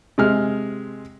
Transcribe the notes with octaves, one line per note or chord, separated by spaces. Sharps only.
C3 G#3 F6